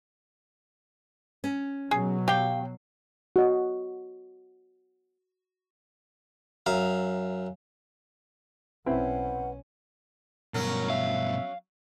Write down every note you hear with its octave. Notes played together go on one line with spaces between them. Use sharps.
C#4
B2 F#3 G#4
G4 F5 G5
F#4 D#5
F#2 E5 F5 A#5
B1 C4 C#4 E4 B4 F#5
G2 B2 F#3 C#4 A#4
E5 F5